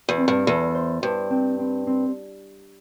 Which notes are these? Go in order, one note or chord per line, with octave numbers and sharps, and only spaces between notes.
E2
C4
G2
E2 A4
C5
G2 C5
C4
C4
C4